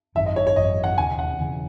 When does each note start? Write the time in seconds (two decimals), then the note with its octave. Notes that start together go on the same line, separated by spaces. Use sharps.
0.15 G#1 F#2 D#3 E5
0.26 D#5
0.36 C#5
0.47 C#5
0.56 G#1 F#2 E3 D#5
0.84 F#5
0.98 E1 D#2 C#3 G#5
1.19 F#5
1.39 E1 E2 C#3 E3